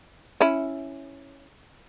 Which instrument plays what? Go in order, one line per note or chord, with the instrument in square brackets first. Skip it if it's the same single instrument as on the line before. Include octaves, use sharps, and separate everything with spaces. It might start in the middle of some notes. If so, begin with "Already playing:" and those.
[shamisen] C#4 E4